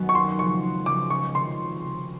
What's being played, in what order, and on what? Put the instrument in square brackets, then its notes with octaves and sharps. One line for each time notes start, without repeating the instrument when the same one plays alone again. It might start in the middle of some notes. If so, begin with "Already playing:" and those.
Already playing: [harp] F#2 D#3 F#3 B3
[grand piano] C#6
[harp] D#2 [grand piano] C6
[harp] C#3 F3 G#3 [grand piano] C#6
[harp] D#2
[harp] C#3 F3 G#3 [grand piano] D6
[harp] C#2 [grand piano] C#6
[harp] C3 D#3 [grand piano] C6
[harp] C#2
C3 D#3